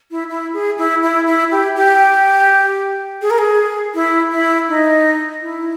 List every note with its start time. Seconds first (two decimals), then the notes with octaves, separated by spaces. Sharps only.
0.11 E4
0.29 E4
0.54 G#4
0.78 E4
1.03 E4
1.27 E4
1.51 G4
1.76 G4
3.22 G#4
3.30 A#4
3.38 G#4
3.94 E4
4.32 E4
4.68 D#4
5.42 E4